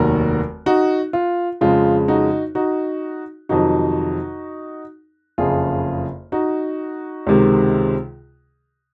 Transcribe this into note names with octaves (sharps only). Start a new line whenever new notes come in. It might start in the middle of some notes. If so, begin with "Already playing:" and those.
Already playing: F1 D#2 D#3 F#3 F#4 A#4
D#4 F#4
F4
F2 C#3 G#3 F4
D#4 F#4
D#4 F#4
F2 C3 D#3 F#3 D#4 F#4
F#1 F2 C#3 F4 G#4
D#4 F#4
C#2 C3 D#3 G#3